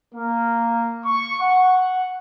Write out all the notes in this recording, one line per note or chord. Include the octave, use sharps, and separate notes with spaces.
A#3
C#6
F#5